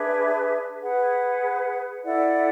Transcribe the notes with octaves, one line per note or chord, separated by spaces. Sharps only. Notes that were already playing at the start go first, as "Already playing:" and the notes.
Already playing: D4 G#4 B4 E5
G#4 B4 F#5
E4 A4 D5 F#5